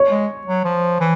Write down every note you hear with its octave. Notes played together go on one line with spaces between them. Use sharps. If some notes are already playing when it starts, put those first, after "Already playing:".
Already playing: C#5
G#3
F#3
F3
E3